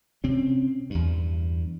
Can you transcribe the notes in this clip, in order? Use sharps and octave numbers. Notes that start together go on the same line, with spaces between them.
C3 C4 C#4
E2 G2